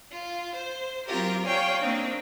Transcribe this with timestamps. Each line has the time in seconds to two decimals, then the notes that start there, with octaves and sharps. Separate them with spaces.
0.11 F4
0.54 C5
1.06 F#3 C4 F4 G4 A#4
1.45 C#5 D5 F5 G5 G#5
1.80 A#3 C4 D4 D#4